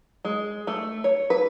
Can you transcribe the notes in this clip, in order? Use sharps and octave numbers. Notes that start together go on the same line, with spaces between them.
G#3
A3
C#5
B4